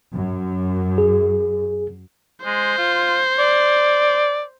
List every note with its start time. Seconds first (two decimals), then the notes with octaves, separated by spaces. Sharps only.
0.13 F#2
0.98 G#4
2.45 G#3 C5
2.78 F4
3.39 D5